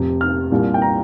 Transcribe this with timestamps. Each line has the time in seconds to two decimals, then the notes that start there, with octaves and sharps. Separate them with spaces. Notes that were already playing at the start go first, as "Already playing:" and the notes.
Already playing: F1 F2 C3
0.21 F6
0.52 C2 A#2 G3
0.74 G5
0.82 A#5